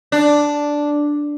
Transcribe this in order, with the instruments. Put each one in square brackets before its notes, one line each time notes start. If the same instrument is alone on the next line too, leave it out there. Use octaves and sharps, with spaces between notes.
[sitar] D4